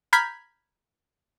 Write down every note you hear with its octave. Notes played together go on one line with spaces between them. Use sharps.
A#5 B5 F6 G6 G#6 B6